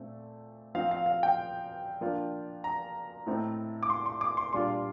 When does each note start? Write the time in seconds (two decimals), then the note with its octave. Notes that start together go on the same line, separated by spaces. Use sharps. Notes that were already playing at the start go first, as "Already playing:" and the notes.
Already playing: A#2 A3 C4
0.75 F3 C4 D#4 F5
0.91 F5
1.06 F5
1.23 G5
2.01 F3 A#3 D4 F4
2.64 A#5
3.26 A2 A3 C4 D#4
3.83 D6
3.90 C6
4.06 C6
4.21 D6
4.37 C6
4.53 A#2 G3 D4 F4 C6